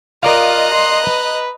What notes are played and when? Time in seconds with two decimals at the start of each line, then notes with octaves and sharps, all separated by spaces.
0.23 F4 A#4 D5 D#5 F5 A#5 F#6
0.74 C6
1.04 B4